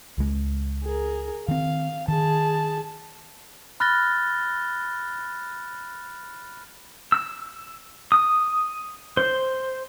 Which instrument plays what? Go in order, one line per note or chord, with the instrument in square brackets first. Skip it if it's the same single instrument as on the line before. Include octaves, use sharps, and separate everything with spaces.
[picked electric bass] C#2 G#3
[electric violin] G#4 A#4
[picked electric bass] D#3 C4 [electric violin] F5
[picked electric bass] D#3 [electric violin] G#4 A5
[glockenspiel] B5 F6 F#6 A6 A#6 G7
[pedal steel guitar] E6
D#6
C5